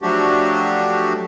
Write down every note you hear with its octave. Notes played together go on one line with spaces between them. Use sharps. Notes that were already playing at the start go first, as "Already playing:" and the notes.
F3 F#3 A3 D4 F#4 G4